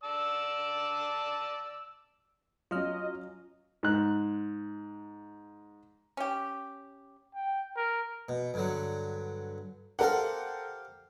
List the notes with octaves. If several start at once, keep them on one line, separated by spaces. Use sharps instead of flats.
D5 A5 E6
F#3 C#4 F4 D#5 F6
G#2 F#6
C#4 G4
G5
A#4
B2
G2 D3 F#3
G4 A4 A#4 C5 F5 F#5